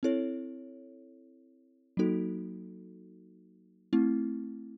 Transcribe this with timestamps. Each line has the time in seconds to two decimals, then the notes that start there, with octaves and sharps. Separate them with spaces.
0.03 C4 E4 A4 C#5
1.97 F#3 A#3 D#4 F#4 A4
3.93 A3 C4 E4